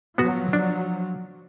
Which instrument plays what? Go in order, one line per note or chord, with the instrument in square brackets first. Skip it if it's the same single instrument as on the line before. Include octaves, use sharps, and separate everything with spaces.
[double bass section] F3 F#3 [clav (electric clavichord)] B3 F#4
[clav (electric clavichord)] D4